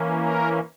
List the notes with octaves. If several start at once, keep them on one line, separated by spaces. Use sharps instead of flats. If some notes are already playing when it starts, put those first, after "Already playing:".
Already playing: E3 A#3 C#4
A#4